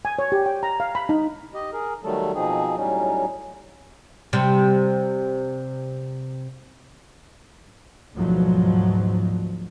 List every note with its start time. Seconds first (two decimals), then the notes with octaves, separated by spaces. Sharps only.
0.05 G#5
0.19 C#5
0.32 G4
0.46 G5
0.63 A#5
0.80 F5
0.95 B5
1.09 D#4
1.54 G4 D#5
1.73 G#4 A#4
2.04 D#3 F#3 G3 A3 A4
2.35 B2 F3 C4 D#4 G#4
2.77 A2 F#3 G3 C#4 D#4
4.33 C3 G3
8.15 D2 G#2 B2 F3 F#3